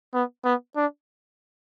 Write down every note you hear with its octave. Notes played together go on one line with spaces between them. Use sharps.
B3
B3
D4